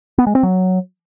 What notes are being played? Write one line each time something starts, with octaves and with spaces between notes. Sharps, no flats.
B3
G#3
C4
F#3